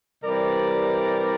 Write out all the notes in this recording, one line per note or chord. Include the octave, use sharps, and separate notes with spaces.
C3 E3 G3 A#4 D5